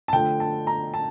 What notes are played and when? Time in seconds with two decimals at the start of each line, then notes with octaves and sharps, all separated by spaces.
0.08 A5
0.13 D3 F3 A3 G5
0.40 A5
0.67 A#5
0.94 A5